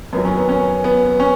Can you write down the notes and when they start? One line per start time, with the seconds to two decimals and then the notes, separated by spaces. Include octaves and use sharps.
0.13 F#2 B3
0.16 D#3 F#3
0.25 C#4
0.37 B3
0.49 C#4
0.84 B3
1.20 C#4